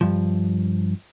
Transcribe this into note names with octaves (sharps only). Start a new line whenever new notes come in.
G2 F3